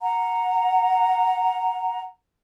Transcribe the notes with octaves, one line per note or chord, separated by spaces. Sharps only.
F#5 A#5